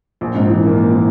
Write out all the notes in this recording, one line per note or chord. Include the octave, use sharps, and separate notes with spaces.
A#1
G#2
E3
A#3
A#3
E3